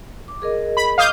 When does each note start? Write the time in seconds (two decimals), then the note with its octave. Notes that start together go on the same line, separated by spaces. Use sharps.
0.28 D6
0.42 G#4 A#4 D#5
0.77 B5
0.98 D#5 F5 D6 D#6 G6